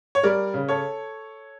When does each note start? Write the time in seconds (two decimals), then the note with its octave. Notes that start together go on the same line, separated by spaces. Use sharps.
0.15 C#5
0.24 G3 A#4 D5
0.54 C#3
0.69 A4 C#5